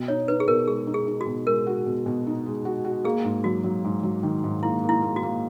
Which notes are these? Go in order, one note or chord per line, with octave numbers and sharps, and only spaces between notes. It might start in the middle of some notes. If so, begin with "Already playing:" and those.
Already playing: B2
D#4 C#5
D#4 B4
G#4
B2 A#4
G#3 G#4
D#4
G#4
D#4
F#4
B2
G#3 A#4
F#4
B2
B2
D#4
G#3
F#4
F#4
A#3 G#4
G#2
F#3 F#4
F#3
G#2
F#3
D#3
G#2
A#3 E4
A#3
E4
A#3
F#4
A#3